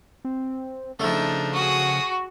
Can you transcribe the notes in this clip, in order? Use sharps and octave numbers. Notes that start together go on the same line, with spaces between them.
C4
C#3 F3 A3 D4 D#4
F#4 G#4 D#6